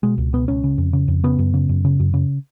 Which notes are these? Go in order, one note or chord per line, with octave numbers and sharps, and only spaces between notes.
B2 G#3
C#2
B2 B3
C#2 C#4
C#3
F2
C#3
F2
C#3 B3
F#2
C#3
F#2
C#3
F#2
C#3